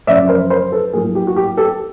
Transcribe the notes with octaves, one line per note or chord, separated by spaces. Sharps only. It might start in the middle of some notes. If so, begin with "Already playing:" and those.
F#2 C#3 F3 D5 E5
A#4 C5
A#4 C5
A4 B4
A2 F#3 A#3 G#4 A#4
G4
F#4
G4
G4 A4